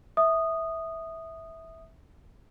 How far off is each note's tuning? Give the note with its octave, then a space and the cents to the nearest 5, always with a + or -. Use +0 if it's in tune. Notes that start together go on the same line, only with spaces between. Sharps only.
E5 -15 D#6 -10